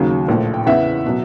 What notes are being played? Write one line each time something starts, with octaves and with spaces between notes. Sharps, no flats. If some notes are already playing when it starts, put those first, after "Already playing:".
Already playing: D#2 C#3 F#3
A#1 A2 F3
G5
E2 C#3 E3 E5 F#5
B2 F#3